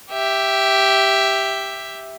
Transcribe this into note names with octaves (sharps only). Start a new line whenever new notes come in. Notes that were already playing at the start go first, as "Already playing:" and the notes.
G4 E5